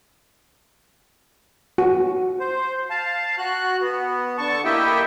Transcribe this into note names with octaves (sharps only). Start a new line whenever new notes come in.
F#4
C5
F5 A5
F#4 F#6
B3
D3 A5 C#6
A#3 E4 G4 D#5 E5 G5